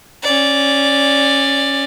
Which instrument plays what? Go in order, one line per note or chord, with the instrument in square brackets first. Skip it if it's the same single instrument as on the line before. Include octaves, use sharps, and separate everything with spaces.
[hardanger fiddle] C#4 D5